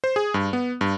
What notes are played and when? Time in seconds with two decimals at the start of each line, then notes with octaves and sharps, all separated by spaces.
0.04 C5
0.16 G#4
0.34 G2
0.53 B3
0.81 G2